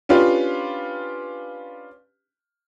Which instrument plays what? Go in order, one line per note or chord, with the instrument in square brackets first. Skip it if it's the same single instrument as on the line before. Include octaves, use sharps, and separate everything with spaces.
[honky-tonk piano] C#4 D4 F4 G4 B4